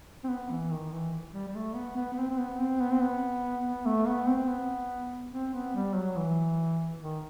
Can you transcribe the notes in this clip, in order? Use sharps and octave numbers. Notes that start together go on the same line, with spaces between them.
C4
B3
E3
D#3
E3
G3
G3
A3
B3
B3
B3
C4
C4
B3
C4
B3
C4
B3
B3
A3
B3
C4
B3
C4
B3
G3
F#3
E3
D#3